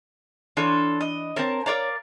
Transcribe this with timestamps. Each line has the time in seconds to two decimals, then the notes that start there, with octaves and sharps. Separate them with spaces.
0.57 E3 D4 F4 A4 C#5
1.01 D#5
1.36 C4 A#4 C#5 A5
1.66 A#4 C#5 D5 F5 A#5